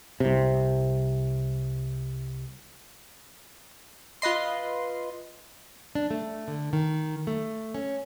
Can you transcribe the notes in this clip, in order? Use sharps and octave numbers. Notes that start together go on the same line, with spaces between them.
C2 C3
F4 B4 D#5 C6
D4
A3
D3
D#3
A3
C#4